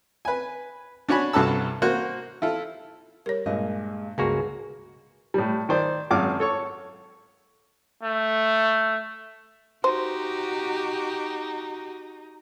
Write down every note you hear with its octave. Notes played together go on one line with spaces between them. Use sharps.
B4 G#5
D4 F#4 C#5 G#5 B5
C2 G2 F#4 A4 A5 E6
A#3 F#4 C5
E4 F4 A4
G3 A#4 C#5
G2 A#2 G#3 D#5
C#2 G2 A#3 F#4 G#4 G#5 A5 C#6
A2 G3
D#3 C5 D5
G#1 F#2 F5 D6
A4 C#5 C#6
A3
D#4 F#4 G4 C5